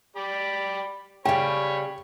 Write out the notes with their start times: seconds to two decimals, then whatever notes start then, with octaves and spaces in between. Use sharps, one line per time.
0.16 G4 D5 B5
1.25 C#3 G3 C#5 G5 B5